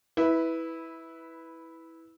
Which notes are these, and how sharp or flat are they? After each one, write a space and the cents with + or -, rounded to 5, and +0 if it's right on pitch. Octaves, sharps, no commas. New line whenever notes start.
E4 -15 B4 +0